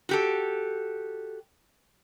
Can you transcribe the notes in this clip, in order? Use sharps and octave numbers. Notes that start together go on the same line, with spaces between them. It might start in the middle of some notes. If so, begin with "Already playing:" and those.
F#4 G4 A4